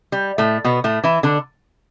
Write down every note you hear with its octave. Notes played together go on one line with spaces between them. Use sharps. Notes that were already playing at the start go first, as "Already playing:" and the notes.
G3
A2 A3
B2 B3
A2 A3
E3 E4
D3 D4